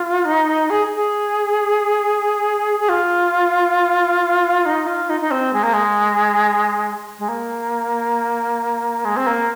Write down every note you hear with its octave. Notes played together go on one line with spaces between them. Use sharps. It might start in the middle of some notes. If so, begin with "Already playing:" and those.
Already playing: F4
D#4
G#4
G#4
G#4
F4
D#4
F4
D#4
D#4
C4
G#3
A#3
G#3
G#3
A#3
G#3
C4
A#3